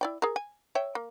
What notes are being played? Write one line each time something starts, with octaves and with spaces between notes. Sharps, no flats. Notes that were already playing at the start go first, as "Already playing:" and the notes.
E4 D5 G5
G#4 A#4
G#5
C#5 E5 G5
A#3